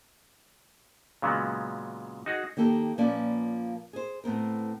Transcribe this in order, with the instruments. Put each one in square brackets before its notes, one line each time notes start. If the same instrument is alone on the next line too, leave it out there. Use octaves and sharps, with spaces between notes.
[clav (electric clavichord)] A#2 C#3 F#3 G#3 B3
D#4 F#4 G#4
[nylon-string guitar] D#3 A#3 G4 A4
A#2 F3 A#3 C#4 B4 D5
G#4 C5
A2 B3 C4 A#4